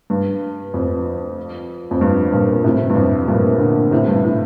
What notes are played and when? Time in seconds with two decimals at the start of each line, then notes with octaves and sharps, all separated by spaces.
0.10 G2
0.74 F2
1.91 F2
2.01 G2
2.32 G2 A#2
2.64 A2 C3
2.90 G2
2.96 F2 A2
3.28 G2 A#2
3.59 A#2 D3
3.91 A2 C3
4.08 G2
4.24 A2